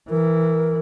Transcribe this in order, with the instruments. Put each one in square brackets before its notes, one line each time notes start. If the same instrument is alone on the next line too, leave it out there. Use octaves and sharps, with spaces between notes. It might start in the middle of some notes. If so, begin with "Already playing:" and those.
[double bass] E3 [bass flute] A#4